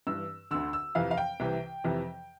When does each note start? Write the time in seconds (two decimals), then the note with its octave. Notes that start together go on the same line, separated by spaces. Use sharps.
0.07 G2 E3 E6
0.51 D2 D3 E6
0.73 E6
0.95 F2 C3 E3 F5
1.11 F5
1.17 G5
1.40 C2 C3 E3
1.84 F2 C3 E3